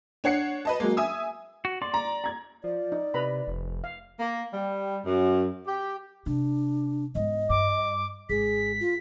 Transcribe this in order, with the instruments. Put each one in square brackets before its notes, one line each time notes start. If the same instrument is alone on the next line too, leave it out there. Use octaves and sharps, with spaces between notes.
[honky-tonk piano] D4 C#5 F#5 C7 C#7
B4 D#5 A5
F#3 G#3 A#3
E5 G#5 D#6 E6
[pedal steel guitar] F#4
[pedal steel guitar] D5 [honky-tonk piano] C6
[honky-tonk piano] A#5
A#5 G#6
[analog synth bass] F3 [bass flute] D5
[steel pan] D#4
[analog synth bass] C3 [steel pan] B4 A#5 B5
[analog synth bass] F1
[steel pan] F5
[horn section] A#3
G3
F#2
G4
[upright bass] C3 [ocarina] D4
[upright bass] G#2 B3 [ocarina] D#5
[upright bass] G2 [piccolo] D6
[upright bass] G#1 [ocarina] G#4 [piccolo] B6
[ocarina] F4